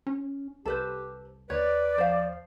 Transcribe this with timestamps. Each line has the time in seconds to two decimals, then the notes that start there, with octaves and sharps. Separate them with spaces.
0.07 C#4
0.66 C2 G4 A4 B4 C5
1.50 D#2 B4 C#5 D5
1.98 F3 C5 F5